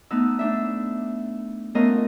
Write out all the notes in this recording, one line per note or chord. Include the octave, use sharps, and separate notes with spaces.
A3 B3 D#4 E6
A3 D4 E5
A3 B3 C#4 F4 A#4 D#5